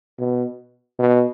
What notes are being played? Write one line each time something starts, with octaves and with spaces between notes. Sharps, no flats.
B2
B2